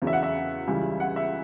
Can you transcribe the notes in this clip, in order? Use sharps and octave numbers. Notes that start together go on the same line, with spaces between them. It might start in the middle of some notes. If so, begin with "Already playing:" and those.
E2 C#3 F#3
E5
F#5
E5
C#2 C#3 E3 G3
F#5
E5